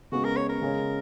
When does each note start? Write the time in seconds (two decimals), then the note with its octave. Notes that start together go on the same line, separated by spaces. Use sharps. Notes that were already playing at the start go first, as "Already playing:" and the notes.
0.12 C#3 G#3 B3 F#4
0.25 A#4
0.37 C#5
0.49 A#4
0.61 C#3 G#3 C#4